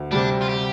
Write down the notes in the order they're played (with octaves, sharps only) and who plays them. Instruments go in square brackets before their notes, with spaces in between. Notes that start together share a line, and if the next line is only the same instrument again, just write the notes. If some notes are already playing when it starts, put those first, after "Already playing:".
Already playing: [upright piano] D2
[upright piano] C3 G3 [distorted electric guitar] D4
[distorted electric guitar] F4
G4